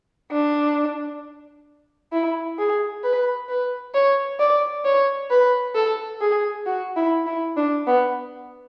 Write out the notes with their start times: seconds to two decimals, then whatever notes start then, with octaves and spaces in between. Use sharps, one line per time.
0.31 D4
2.13 E4
2.58 G#4
3.04 B4
3.49 B4
3.94 C#5
4.40 D5
4.85 C#5
5.30 B4
5.75 A4
6.21 G#4
6.66 F#4
6.96 E4
7.26 E4
7.57 D4
7.87 B3